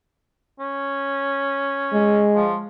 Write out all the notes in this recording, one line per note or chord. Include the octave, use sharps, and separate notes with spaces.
C#4
G#3
F3